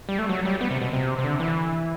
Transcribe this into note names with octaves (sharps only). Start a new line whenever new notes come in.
G3
A3
F#3
G3
B3
C3
B2
C3
C3
D3
E3